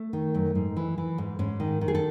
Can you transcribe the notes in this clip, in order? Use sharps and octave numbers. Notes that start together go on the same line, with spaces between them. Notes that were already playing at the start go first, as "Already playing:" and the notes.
Already playing: A3
D#3
F#2
G#2
E3
E3
G#2
G#2 C#4
D#3
D#3
G#4
A4